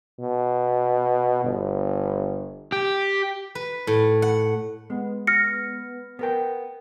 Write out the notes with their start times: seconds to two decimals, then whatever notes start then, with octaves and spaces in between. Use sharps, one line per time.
0.20 B2
1.44 G1
2.72 G4
3.55 B4
3.87 A2
4.22 F#5
4.90 G#3 B3
5.27 F6 A#6 C#7
6.19 B3 A#4 G5